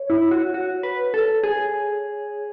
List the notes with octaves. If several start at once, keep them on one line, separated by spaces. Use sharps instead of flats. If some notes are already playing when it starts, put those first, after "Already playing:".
Already playing: C#5
E4
F#4
F#4
B4
A4
G#4